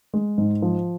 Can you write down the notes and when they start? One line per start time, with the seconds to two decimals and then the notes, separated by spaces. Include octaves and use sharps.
0.14 G#3
0.38 G#2
0.62 F3